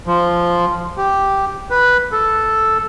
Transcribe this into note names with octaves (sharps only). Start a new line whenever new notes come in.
F3
G4
B4
A4